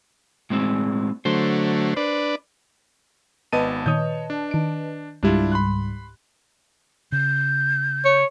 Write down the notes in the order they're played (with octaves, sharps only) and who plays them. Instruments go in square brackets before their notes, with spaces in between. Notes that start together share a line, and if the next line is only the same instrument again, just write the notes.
[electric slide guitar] A2 G#3 C4
[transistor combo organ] D3 F#3 A3 [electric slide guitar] C5
[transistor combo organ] D4 B4 D5
[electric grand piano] G#1 B3 D#7 [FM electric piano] B4 D#5 A5
[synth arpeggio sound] A#2 D#3 D#6 [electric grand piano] C#5 G6
[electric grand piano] D4
[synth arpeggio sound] D#3 D7
[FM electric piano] C#2 G#2 G3 [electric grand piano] D4 E4 F4
[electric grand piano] B5 C6 F#6
[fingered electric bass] C#3 [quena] G6
[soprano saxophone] C#5